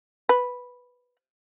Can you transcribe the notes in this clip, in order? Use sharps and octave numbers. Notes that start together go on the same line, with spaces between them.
B4